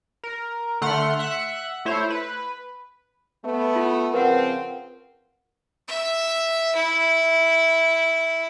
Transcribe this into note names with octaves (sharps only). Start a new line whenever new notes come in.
A#4
D3 A3 F#5 C6 F6
E5 F#5 F#6
A3 E4 C5 C#5
B4
A3 B3
F4
C#3 F3 C4 A#4 B4 F#5
E5
E4